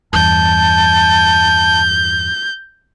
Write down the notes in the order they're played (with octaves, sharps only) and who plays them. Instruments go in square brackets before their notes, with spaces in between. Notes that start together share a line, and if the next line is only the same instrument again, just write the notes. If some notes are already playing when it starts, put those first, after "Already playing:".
[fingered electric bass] E2 G2 [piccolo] A5 [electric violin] G6